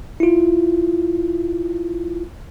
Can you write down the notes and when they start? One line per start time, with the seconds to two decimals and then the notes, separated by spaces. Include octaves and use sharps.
0.20 E4 F4